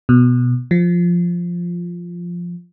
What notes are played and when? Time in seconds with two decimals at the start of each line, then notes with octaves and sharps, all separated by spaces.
0.09 B2
0.71 F3